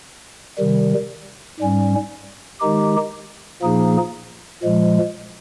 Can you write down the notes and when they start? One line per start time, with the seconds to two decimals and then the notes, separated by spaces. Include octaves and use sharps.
0.59 C3 D#3 G3
1.60 G#2 G3 C#4
2.61 D#3 G#3 D#4 G4
3.62 A#2 F3 A#3 D#4 G#4
4.63 A#2 F3 G#3